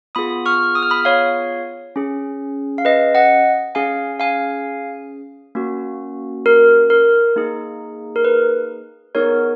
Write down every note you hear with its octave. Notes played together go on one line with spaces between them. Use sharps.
B3 F4 G#4 B5 D#6
C#6 F6
D#6
F6
B5 D#6
C#5 F5
C#4 G#4
F5
B4 D#5
D#5 F#5
C#4 G#4 F5 G#5
F5 G#5
A#3 C#4 F#4
A#4
A#4
A#3 D#4 G#4
A#4
B4
B3 D#4 G#4 A#4 C#5